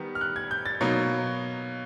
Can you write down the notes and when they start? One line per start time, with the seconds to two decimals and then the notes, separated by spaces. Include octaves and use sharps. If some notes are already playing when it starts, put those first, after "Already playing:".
Already playing: D#3 G3 B3
0.15 F6
0.21 F#6
0.36 G#6
0.51 G6
0.66 A6
0.81 B2 F#3 A#3 D#4